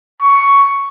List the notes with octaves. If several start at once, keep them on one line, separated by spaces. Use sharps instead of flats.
C#6